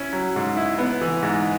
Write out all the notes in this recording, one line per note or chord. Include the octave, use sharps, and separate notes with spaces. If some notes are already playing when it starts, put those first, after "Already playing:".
Already playing: C#4 E4
F#3
G#2
E4
B3
E3
G#2